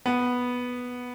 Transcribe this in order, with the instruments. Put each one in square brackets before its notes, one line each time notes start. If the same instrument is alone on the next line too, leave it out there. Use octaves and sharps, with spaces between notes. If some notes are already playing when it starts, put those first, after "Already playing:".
[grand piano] B3